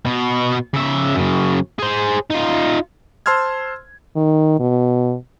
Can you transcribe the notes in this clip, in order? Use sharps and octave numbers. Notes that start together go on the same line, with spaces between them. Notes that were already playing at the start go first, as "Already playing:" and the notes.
B2 B3
C#3 E5
F#2 C#3
G#4 C5
D#4 F4
C5 A5 C6 E6 F6 G#6
D#3
B2